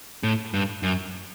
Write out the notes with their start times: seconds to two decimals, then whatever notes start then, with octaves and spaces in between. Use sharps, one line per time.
0.23 A2
0.54 G2
0.83 F#2